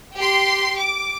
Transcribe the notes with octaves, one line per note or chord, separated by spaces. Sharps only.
G4 C6
D6